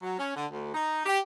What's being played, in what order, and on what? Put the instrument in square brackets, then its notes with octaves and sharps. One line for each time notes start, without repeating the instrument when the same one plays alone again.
[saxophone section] F#3
C#4
D3
D2
D#4
G4